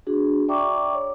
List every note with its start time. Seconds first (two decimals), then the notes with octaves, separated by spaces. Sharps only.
0.07 D4 F#4 G#4
0.48 D5 E5 G5 A#5 C#6 D6
0.94 C#5